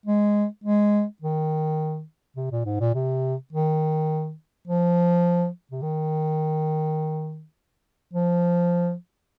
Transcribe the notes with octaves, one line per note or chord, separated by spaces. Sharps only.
G#3
G#3
D#3
C3
A#2
G#2
A#2
C3
D#3
F3
C3
D#3
F3